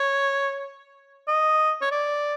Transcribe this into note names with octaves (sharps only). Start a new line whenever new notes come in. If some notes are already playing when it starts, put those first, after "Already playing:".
Already playing: C#5
D#5
C#5
D5